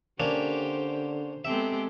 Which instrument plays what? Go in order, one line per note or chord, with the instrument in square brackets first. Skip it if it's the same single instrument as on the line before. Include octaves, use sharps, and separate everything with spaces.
[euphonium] D3 [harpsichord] A#3 C#4 D4 [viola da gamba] G4 [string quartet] C5
[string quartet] G#3 A4 [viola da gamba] B3 C4 G4 [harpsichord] E5